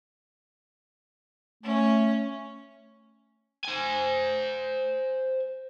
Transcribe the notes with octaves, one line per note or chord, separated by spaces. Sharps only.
A3 C#4
C5 G#5